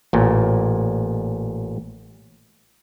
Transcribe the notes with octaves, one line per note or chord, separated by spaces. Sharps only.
A1 A#2